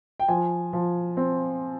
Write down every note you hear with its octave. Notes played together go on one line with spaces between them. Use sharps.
G5
F3 G#5
F3
C4